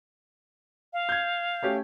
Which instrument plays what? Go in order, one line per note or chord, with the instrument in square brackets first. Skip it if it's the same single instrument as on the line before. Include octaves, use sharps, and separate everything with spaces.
[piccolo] F5
[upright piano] G6 G#6
A3 C#4 G4